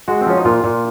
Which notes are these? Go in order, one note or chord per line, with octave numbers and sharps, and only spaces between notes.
G#3 F#4
C4
F3 C#4
D#4
A#2 F4
A#2